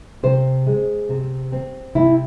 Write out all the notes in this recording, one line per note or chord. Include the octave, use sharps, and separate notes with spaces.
C3 C5
G#3
C3
C4
C3 E4